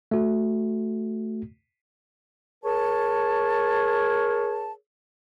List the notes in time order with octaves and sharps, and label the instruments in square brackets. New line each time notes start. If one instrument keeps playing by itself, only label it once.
[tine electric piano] A3 F#4
[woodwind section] G#4 A#4 C#5 A5